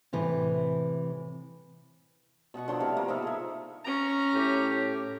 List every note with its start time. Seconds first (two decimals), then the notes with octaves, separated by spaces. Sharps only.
0.13 A2 C3 E3
2.54 B2 D#5 F#5 C#6
2.68 D3 F3 F#3
2.80 A2 C3 A#4 F5
2.97 A#3
3.08 F3 B3 D#4 A4
3.22 G#4 E5
3.84 C#4 A#5
4.34 A2 G4